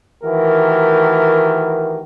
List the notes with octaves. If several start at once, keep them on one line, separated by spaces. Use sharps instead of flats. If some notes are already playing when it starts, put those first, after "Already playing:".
D#3 E3 A3 F#4 G4 A#4